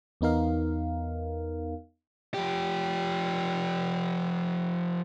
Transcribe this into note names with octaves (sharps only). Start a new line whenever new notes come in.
E2 B3 D#4 A#4 F5
F3 G4